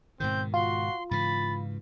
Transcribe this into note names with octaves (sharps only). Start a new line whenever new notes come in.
G#2 B2 D#3 C4 G6
F4 F#4 C6
G#2 C#3 E3 B5 A6